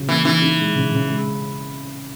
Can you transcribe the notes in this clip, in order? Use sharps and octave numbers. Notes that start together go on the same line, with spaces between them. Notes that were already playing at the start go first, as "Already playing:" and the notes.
Already playing: C#3 F#3
E3 A#3
E3 D#4
D#4
G#3
C#3
C#3
G#3